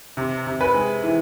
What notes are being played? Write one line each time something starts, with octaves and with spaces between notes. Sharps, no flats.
C3
C3
B4
G#3
E3